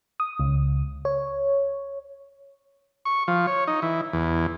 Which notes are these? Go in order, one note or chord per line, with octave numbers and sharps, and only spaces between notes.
D#6
C#2
C#5
C#6
F3
C#5
D#4
E3
E2